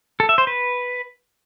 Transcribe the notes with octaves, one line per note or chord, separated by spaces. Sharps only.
A4
E5
C5
B4